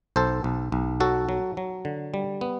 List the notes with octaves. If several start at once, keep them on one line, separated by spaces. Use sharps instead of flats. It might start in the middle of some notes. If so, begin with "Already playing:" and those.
B1 A4 C5
B1
B1
F#3 F#4 A4
F#3
F#3
D3
G3
B3